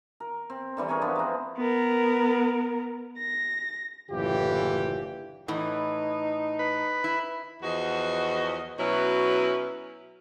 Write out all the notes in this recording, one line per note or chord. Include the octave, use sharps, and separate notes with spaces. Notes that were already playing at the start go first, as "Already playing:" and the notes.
A#4
C4
D3 E3 G3 C4
G#4 A#4 C#5 G#5
F3 B3 D4
G#3 C4
B3 A#4
A#6
F#1 A2 D3 E3 F4 G4
A2 E3 D#4
B4
E4
E2 F3 F#4 D#5
B2 F#3 C#4 E4 B4